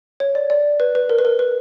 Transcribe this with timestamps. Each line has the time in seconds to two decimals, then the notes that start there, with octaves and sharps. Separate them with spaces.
0.20 C#5
0.35 D5
0.50 D5
0.80 B4
0.95 B4
1.10 A#4
1.19 B4
1.25 A#4
1.39 B4